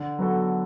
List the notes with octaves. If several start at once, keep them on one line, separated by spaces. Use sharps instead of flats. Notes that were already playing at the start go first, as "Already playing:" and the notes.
Already playing: D3
F#3 B3 F#4 A4